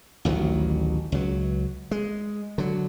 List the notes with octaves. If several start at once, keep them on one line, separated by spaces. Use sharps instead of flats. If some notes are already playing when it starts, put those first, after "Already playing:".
A1 D2 D#3 F#3
C#2 F#3
G#3
D3 F#3